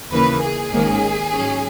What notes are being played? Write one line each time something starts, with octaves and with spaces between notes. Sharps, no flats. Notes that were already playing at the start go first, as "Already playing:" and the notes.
D#2 C#3 E3 A#3 B4
G#4
G#1 G#2 D#3 A#3 C#4
G#2 F#3 C#4